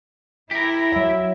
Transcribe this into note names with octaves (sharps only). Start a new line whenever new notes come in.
E4 G4 A#4
F#3 E5